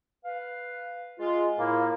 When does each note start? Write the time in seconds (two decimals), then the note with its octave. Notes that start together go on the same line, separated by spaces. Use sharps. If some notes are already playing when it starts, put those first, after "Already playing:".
0.24 B4 F5
1.20 G#3 F4
1.59 A2 A#3 E4